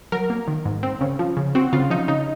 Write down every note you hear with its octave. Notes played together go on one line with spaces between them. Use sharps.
F#3 A#4
A#3
D#3
G#2
C4
C#3
F3
C#3
C4 F#4
C#3 F4
F3 D#4
C#3 D#4